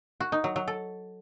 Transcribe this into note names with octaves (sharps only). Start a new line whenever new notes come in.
F#4
D#4
F#3
F#3
A4